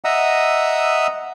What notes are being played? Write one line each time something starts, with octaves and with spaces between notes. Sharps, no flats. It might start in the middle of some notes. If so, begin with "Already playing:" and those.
D#5 E5 F#5 A#5 D#6 E6